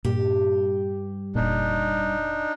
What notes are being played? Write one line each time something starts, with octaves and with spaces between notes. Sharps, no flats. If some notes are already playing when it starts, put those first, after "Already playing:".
G2 A#2 G4
F1 A#2 D4 D#4